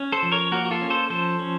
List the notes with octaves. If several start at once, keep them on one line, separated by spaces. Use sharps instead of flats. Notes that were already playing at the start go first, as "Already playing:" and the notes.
Already playing: C#4
A4 C5
F3
A#4 C#5
A#3 F#4 A#4
F#4
F4 A4
C#4
A4 C5
F3 A4 C5
C#4